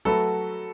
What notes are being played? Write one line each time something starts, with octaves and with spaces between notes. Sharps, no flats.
F#3 A3 F#4 A4 B4